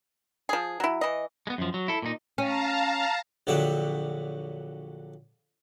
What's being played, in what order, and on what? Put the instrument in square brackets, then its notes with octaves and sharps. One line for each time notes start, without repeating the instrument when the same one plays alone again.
[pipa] F3 G#4
F#3 E4
E3 D#5
[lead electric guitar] G#3 B3
F#2 F3
F#3
E4 A4
A#2 D#4
[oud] C#4 [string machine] F5 A5 A#5
[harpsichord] A#1 D3 F#3 E5 G5